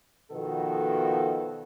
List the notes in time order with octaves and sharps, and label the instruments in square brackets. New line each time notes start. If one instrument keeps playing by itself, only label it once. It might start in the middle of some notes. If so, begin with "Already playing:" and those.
[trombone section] B2 D#3 F3 B3 F#4 A4